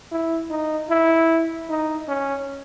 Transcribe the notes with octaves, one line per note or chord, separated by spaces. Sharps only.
E4
D#4
E4
D#4
C#4